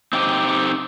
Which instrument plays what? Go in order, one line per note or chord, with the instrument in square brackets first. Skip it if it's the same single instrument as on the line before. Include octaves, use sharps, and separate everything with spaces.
[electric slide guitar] C4 D#4 G4